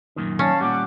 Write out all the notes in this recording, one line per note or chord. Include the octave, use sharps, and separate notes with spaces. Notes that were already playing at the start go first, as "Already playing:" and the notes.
F#2 A#2 D#3
C#4 D5 F5 A5
A#2 G3 F#5 D6